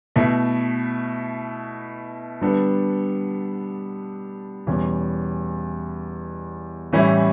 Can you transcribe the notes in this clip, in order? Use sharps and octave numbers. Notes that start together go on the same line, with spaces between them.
B2 A3 E4
D3 G3 B3 D4 A4
E2 B2 G3 C#4
A2 E3 G3 C#4 E4